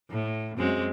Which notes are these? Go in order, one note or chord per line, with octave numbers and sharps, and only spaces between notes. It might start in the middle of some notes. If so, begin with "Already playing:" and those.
A2
F#2 G#3 C4